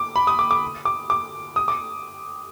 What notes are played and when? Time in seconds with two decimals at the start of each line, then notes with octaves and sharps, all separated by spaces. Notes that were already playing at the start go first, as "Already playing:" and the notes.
Already playing: D6
0.16 B5
0.27 D#6
0.39 D6
0.51 D6
0.85 D6
1.10 D6
1.56 D#6
1.68 D6